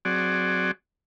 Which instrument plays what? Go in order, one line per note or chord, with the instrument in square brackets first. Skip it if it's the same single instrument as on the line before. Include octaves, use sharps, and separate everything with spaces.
[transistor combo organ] F#3 C4 F#4 G#4 D5